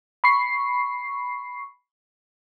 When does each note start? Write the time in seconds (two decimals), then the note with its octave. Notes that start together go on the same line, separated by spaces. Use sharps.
0.24 B5 C#6 C7